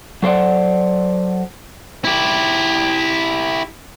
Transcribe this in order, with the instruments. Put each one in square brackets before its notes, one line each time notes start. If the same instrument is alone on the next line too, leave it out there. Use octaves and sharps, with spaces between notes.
[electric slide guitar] F#3 A4 C5 D5 F#5
[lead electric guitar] E4 G4